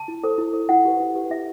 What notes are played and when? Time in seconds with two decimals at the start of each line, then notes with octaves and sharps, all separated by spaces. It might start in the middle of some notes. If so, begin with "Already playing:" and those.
Already playing: A5
0.08 E4
0.24 A4 C5
0.38 E4
0.53 A4 C5
0.69 E4 F#5
0.85 G4 B4
1.00 E4
1.15 G4 B4
1.30 E4 E5